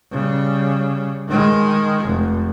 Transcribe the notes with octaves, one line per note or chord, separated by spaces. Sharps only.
C#3 G3
D#3 G#3
F1